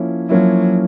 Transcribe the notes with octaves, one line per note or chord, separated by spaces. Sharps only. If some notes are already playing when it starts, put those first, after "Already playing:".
Already playing: F3 A#3 C#4 E4
F3 F#3 A#3 C#4 E4